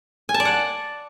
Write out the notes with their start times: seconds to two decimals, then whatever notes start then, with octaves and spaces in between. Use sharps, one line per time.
0.29 G#5
0.34 A5
0.40 D5
0.45 F#5